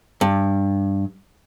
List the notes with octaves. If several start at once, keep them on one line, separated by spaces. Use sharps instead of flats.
G2